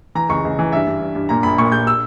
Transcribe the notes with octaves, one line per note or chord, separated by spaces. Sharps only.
E3 A#5
C#2 C#6
C#2
E3
G2 E5
G2
G2
G2
A#2 A#5
A#1 B5
A#2 C#6
A#2 G6
E6